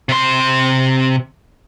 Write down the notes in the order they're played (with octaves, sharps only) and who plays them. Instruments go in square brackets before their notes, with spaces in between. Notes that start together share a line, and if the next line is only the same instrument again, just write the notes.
[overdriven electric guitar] C3 C6